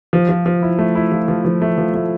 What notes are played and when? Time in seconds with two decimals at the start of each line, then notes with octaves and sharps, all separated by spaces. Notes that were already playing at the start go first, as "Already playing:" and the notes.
0.13 F3
0.29 F3
0.46 F3
0.62 E4
0.78 A3
0.95 E4
1.12 F3
1.28 F3
1.45 F3
1.62 A3
1.78 F3
1.94 A3